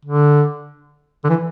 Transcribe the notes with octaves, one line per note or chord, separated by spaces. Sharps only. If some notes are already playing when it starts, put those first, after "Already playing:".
D3
D3
E3